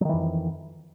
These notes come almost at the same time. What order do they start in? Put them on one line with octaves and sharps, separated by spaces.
F#3 D#3 E3 F2